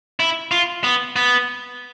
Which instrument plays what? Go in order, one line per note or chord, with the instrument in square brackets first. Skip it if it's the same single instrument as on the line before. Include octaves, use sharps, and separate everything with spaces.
[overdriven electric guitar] E4
F4
B3
B3